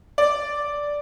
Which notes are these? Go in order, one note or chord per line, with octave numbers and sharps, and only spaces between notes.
D5